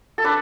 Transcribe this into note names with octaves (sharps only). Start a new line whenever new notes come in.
A4
D4 B4